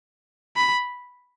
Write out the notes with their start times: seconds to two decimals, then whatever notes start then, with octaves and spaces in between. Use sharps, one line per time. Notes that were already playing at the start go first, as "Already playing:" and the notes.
0.56 B5